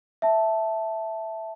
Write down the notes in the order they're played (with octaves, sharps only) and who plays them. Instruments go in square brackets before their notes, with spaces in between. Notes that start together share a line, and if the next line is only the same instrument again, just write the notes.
[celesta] E5 A5